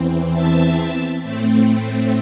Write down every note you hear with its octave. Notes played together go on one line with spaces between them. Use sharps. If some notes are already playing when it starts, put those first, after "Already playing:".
Already playing: E2 E3 C4
E5 A5
A2 A3 C4